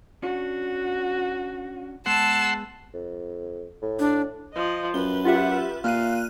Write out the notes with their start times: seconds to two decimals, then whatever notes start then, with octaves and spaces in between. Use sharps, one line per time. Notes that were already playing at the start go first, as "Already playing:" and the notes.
0.23 C#4 D4 F#4
2.06 G#3 B3 G#4 F#5 A5 C6 E6
2.94 F2
3.82 A2
3.99 D4
4.54 F3 D#5
4.94 F#2 B4 G7
5.25 F4 G4 E5 F#5
5.84 A#2 F5 F6 F#6 D#7